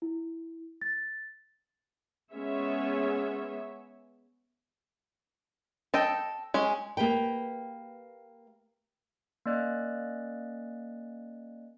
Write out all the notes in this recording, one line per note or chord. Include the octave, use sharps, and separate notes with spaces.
E4
A6
G#3 B3 C#4 C#5 E5
A4 D#5 G5
G#3 C#4
A#3 G4 B4 G5
A#3 C#4 D5 D#5 F#6